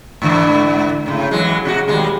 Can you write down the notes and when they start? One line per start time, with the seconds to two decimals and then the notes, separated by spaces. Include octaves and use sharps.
0.22 G#2 D3 E3
1.06 A2 C#3
1.31 E3 F#3 G#3
1.65 B2 D4 F#4
1.88 D#2 G3 G#3